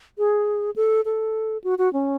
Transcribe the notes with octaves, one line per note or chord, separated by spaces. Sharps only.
G#4
A4
A4
F#4
F#4
C#4